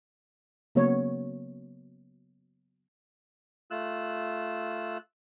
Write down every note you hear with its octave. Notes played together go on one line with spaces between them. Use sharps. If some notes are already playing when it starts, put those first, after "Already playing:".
C#3 F#3 A#3 B3 C#5
A3 F4 E6 F#6